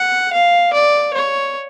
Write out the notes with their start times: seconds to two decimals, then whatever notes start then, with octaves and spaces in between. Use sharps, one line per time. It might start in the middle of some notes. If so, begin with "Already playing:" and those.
Already playing: F#5
0.33 F5
0.73 D5
1.14 C#5